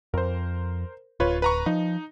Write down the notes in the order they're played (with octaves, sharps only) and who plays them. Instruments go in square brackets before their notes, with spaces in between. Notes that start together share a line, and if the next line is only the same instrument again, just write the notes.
[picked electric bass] F2 [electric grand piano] A#4 C5
[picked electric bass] D1 [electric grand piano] F4 B4 C#5
[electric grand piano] B4 A#5 C#6
[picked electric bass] F3 [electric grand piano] D#4